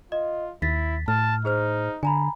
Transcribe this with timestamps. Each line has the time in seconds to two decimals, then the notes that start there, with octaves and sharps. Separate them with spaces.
0.12 F4 D#5
0.62 D#2 E4 A6 B6
1.08 A2 A5 F6
1.45 D#4 G#4 C5 F6
2.03 D3 G#5 A#5 B5